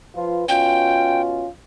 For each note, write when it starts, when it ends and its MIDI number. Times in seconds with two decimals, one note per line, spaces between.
0.14 0.45 53
0.14 0.45 65
0.14 0.45 71
0.49 1.47 47
0.49 1.47 61
0.49 1.47 65
0.49 1.21 79